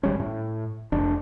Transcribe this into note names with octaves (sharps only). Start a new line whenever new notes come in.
G#1 G3 C#4
A2
F1 D4